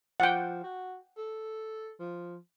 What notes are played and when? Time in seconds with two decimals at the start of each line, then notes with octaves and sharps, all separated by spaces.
0.20 F3 F#5 G5
0.63 F#4
1.17 A4
1.99 F3